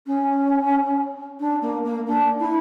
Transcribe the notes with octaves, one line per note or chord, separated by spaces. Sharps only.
C#4
D4
A#3
A#3
D4
E4